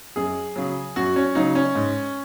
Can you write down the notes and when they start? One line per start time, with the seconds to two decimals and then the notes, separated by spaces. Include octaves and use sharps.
0.16 F#2 G#4
0.56 C#3 F#3
0.96 F#2 F#4
1.16 C#4
1.35 C#3 F#3 D#4
1.55 C#4
1.75 G#2